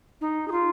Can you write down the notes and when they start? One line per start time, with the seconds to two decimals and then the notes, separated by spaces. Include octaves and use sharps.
0.21 D#4
0.48 G#4
0.52 F4